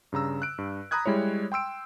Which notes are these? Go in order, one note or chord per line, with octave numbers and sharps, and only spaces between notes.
G2 C#3 A#5 E6
F#6 D7
G2
A#5 B5 D#6 F#6 G#6
G3 G#3 E4 C#5
G5 C6 E6 D7